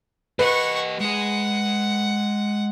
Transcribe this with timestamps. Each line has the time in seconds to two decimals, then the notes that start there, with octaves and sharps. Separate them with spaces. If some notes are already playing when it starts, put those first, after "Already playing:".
0.39 G4 B4 D#5 F#5 C#6
1.00 G#3 G#4 F#5